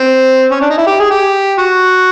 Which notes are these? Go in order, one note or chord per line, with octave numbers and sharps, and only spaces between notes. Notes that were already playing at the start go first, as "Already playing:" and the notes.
Already playing: C4
C#4
D4
D#4
E4
G4
G#4
G4
F#4